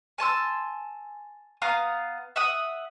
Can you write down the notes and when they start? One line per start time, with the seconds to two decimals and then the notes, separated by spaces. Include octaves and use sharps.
0.18 G#5 A5 C6 E6
1.62 B3 F5 A#5 D#6
2.36 E5 F#5 D#6